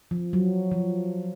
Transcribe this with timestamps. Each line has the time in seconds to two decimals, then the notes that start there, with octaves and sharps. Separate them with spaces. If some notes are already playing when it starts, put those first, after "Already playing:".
0.11 F3
0.33 F#3
0.72 F3